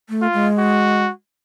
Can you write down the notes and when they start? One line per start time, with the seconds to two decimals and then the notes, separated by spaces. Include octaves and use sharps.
0.09 A3
0.22 F4
0.34 G#3
0.59 F#4